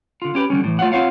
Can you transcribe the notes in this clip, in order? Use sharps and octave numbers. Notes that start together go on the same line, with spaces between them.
D3 F4
C#4 G4 B4
D3 D#3 G3 C#4
A2 E3
A3 F4 C#5 F5 F#5
C4 F4 C#5 F5 F#5